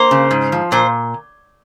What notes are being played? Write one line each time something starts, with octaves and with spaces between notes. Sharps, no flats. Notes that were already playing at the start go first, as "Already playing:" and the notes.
Already playing: A#3 C5
C#3
G#2
F3
A#2 C5